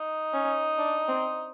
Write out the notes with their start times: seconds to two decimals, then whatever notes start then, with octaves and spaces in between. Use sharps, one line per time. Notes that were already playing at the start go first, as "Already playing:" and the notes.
Already playing: D#4
0.33 C#4
0.78 D4
1.08 C4